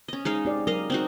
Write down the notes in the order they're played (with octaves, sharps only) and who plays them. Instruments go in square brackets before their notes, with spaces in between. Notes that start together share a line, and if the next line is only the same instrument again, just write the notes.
[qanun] C#4 D#5
G#3 D#4 F5
[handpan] C4 G4 D5
[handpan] F#3 A#4 [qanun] D#5 F5
[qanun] C4 D#4 F#4